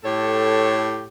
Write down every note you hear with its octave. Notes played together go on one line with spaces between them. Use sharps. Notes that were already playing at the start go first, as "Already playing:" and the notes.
A2 G4 A4 C#5